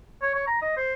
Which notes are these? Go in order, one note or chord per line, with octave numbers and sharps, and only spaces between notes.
C#5
C#5
A#5
D#5
C5